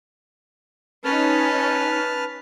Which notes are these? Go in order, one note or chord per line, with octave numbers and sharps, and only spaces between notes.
C#4 D#4 B4 A5 F6